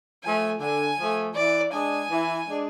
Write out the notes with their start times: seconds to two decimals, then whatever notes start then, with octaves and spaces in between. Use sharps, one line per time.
0.24 F3 A3 G#5
0.60 D3 G#5
0.98 F3 A3
1.35 E3 D5
1.73 G#3 D4 G#4 G#5
2.10 E3
2.48 G#3 D4 G#4